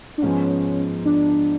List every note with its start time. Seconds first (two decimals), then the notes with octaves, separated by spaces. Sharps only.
0.18 D4
0.22 G#2 F3 G#3 B3 C#4
1.05 D4